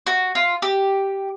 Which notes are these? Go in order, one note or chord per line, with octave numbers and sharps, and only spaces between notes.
F#4
F4
G4